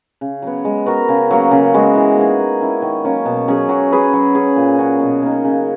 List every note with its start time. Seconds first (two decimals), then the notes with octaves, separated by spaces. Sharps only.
0.21 C#3
0.42 F#3 B3
0.65 G#3
0.86 B3 F#4 A#4
1.09 C#3
1.31 F#3 A#3
1.51 C#3
1.74 G#3 B3 F#4
1.95 E3
2.17 A#3 D#4 G#4
2.39 A#3
2.61 C#4 E4
2.82 D#3
3.05 F#3 A#3 C#4
3.25 B2
3.48 F#3 C#4 G#4
3.69 F#3
3.92 C#4 G#4 B4
4.13 F#3
4.35 C#4 G#4
4.56 A#2
4.78 F#3 C#4 F#4
5.00 B2
5.23 A#3 D#4
5.44 C#3